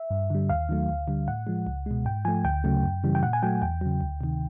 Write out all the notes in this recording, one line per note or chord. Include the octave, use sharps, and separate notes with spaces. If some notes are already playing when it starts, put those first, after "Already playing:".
Already playing: E5
G2
D3 G3
D#2 F5
D#3 F#3 A3
D2
D3 G3
A2 F#5
F3 G#3
C#2
B2 G#3
G#2 G5
F3 A3 G#5
D2 G5
C#3 F#3 A3
F#2
C#3 E3 G3
G5
A#2 F#5
G#5
F#3 A3 G5
E2 G5
C#3 F#3
D2
C3 D#3